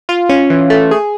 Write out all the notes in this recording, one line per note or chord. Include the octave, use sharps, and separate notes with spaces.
F4
C#4
E3
A3
G#4